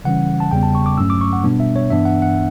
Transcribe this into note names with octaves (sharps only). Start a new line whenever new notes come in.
C#3 E3 G3 C#4 F#5
A5
E2 C#3 G3 B3 G5
A5
C#6
D6
G2 F#3 A3 C#4 E6
D6
C#6
F#5
B2 G3 B3 D4
E5
C#5
G2 E3 B3 D4 E5
F#5
F#5